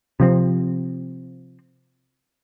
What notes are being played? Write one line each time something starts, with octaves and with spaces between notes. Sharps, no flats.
C3 F3 C4